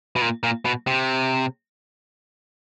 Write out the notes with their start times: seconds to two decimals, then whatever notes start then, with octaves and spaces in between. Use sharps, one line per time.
0.16 B2
0.22 A#2
0.43 A#2
0.65 B2
0.87 C3